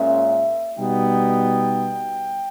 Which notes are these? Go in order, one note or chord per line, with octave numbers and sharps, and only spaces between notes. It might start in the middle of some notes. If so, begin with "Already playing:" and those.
Already playing: A#2 G#3 C#4 E5
B2 G3 B3 D#4 G5